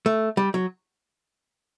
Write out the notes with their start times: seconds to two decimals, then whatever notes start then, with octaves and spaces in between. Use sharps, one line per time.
0.06 A3
0.37 G3
0.54 F#3